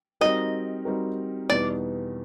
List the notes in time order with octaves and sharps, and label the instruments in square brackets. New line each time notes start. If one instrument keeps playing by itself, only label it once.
[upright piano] G3 C4 D#4 F#4 A#4 [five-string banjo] D#5
[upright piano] G3 C4 D#4 F#4 A#4
[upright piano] E2 B2 G3 B3 D#4 [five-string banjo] D5